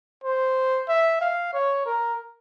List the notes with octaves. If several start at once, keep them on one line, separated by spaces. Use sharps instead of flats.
C5
E5
F5
C#5
A#4